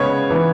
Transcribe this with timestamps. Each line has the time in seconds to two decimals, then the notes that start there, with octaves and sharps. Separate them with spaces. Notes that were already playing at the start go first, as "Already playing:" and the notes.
Already playing: C#3 G#3 B3 C#5
0.30 E3 B3